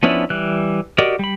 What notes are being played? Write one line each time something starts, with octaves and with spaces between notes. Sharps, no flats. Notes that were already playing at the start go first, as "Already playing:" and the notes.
F3 B3 C#4 D4 E4
E3 G3 F#6
F#4 G4 A#4 D5 D#5
G3 B5